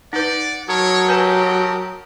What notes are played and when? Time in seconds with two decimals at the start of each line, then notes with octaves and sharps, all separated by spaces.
0.13 D#4 B4 D5 F#5
0.68 F#3 A#4 C#5 A5 D#6
1.09 G4 B4 G#5 A#5